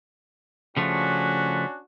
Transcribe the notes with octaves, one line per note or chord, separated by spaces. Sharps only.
C#3 F3 A3 C#4 D4 F#4